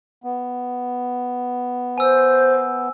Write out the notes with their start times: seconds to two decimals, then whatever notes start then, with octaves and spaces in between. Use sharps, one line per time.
0.24 B3
1.98 C5 G#5 E6